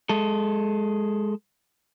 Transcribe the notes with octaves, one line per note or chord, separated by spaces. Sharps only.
G#3 A4